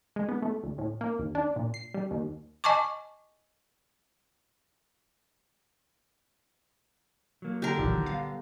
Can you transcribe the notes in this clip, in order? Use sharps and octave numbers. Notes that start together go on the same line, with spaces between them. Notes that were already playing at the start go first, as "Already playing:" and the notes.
G#3
B3
A3
D2
A2
A#3
D#2
D4
A#2
C7
G3
D#2
D#5 G#5 A5 C#6 D6
F#3 A#3
D3 G4 A#4
G1 C2 A#2 D#3 E3 F#3
G3 B3 F5